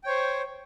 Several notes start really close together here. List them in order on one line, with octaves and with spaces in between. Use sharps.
G5 C#5 C5